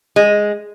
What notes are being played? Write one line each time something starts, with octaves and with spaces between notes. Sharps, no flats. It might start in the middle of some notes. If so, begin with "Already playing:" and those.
G#3